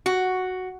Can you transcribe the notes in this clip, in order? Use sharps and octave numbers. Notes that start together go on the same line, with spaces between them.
F#4